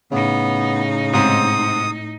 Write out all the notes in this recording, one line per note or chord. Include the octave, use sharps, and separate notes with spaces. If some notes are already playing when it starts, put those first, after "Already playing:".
A2 C#3 B3 D#4
G#2 C3 C4 D#6